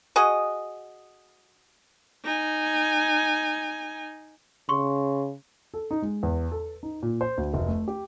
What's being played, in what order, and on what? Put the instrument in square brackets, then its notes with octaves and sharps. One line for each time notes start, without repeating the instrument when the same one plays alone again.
[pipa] F#4 G#4 D#5
[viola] D#4 G#5
[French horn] C#3 [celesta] C6 C#6
[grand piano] A4
D#4
G#3
E2
A4
D#4
A#2
C5
D2
F1
A3
G4